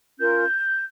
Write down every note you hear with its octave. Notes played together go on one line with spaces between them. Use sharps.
C#4 F4 A#4 G6